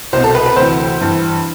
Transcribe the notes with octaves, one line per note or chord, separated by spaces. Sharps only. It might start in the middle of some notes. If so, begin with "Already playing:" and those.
C2 B2 C5
A4
B4
B4
D2 C3 E3 C5
G2 E3